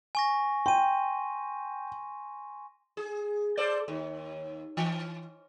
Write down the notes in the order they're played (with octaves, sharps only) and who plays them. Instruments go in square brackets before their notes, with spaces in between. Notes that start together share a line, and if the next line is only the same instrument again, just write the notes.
[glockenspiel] G#5 C#6 A#6
[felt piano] G5 [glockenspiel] C6 D#7
[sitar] G#4
A4 C5 D5
D#2
E3